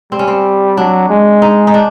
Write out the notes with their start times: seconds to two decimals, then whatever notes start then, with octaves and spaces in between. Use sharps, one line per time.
0.12 G3 C4
0.19 C#4
0.28 C4
0.77 F#3 D4
1.09 G#3
1.42 D#4
1.67 D#4
1.74 D4